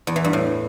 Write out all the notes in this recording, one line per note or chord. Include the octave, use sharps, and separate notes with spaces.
E2
E3
G2
A2